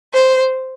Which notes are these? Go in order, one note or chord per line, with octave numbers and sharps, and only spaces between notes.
C5